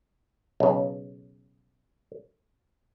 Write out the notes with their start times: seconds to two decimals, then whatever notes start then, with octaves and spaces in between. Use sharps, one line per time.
0.60 B1 C#3